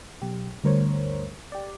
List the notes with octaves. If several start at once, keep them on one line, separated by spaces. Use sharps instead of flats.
B1 G4
D2 G2 A#4 C5 C#5
G4 D5